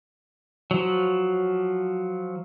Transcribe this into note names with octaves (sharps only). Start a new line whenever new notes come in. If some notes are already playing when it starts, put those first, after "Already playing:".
F3 F#3